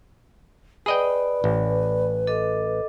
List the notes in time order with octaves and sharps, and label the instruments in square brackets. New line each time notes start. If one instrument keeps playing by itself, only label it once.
[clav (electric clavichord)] G#4 D#5 G5 [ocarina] B4 [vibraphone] D5 B5
[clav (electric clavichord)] A1
[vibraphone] A4 D#5 D6